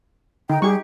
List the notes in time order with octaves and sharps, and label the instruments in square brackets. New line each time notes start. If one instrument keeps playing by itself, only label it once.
[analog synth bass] D3 [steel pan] D#4 [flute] G5
[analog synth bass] G3 [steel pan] G4 C#6 [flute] G#4